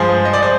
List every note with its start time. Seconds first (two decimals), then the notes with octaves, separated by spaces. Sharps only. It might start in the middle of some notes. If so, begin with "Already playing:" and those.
Already playing: G2 F3 G#3 G#4 C5
0.25 D#5
0.34 D5
0.43 C5